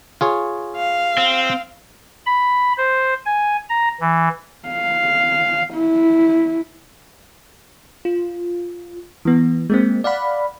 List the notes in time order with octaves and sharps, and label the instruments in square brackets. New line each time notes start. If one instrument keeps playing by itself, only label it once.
[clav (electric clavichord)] F4 G#4 C#5
[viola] F5
[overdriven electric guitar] C4
[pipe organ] B5
C5
G#5
A#5
E3
[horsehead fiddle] F5
E4
[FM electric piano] F4
E3 B3
G#3 A#3 C4
D5 F5 F#5 B5